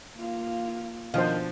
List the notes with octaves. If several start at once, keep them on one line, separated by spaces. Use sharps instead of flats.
A#3 F4
B2 D#3 F3 D4 C5 F5